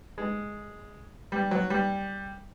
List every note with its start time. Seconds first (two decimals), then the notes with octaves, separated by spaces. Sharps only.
0.18 G#3
1.32 G3
1.51 F#3
1.70 G3